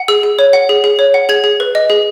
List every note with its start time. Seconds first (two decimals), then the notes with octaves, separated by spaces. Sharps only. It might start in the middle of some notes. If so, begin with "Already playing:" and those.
Already playing: F#5
0.08 G#4 E6
0.23 G#4
0.39 C#5
0.53 F#5
0.69 G#4
0.84 G#4
0.99 C#5
1.14 F#5
1.29 G#4 G#6
1.44 G#4
1.60 B4
1.75 D#5
1.90 G#4